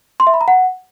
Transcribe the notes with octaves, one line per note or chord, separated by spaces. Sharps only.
C6
E5
B5
A#5
F#5